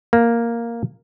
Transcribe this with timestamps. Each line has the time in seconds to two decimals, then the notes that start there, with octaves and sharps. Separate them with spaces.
0.13 A#3